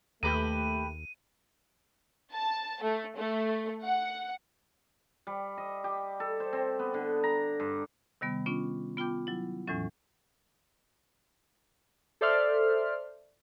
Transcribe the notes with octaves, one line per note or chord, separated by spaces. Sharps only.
D#2 A3 G4 B4 A#5 D#7
A5
A3
A3
F#5
G3
D#5
G4
A4
C5
C4
B3
D3
A#5
G2
C3 D#3 G3 B3
B3 C#4 D4 F4
B3 F4 G5 D6 G6
F#3 E4
E2 A2 E3 F#3 C#4
A4 C5 D5 E5 C6 F6